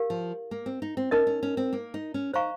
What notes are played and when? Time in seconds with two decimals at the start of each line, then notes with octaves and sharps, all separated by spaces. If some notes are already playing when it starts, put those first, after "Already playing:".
Already playing: G4 A#4 F5
0.10 F3
0.51 A#3
0.66 C4
0.82 D#4
0.97 C4
1.11 C#4 D#4 A#4 D#5
1.27 C#4
1.43 C#4
1.57 C4
1.73 A#3
1.94 D#4
2.14 C#4
2.34 D#4 C5 F5 A#5 C#6